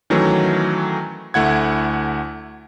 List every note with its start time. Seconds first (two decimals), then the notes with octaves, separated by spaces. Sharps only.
0.10 D#3 E3 F#3 A3 C#4
1.34 D2 A3 E4 F#5 G#6